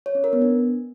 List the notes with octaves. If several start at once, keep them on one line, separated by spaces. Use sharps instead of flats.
C#5
C#4
A#4
B3
D4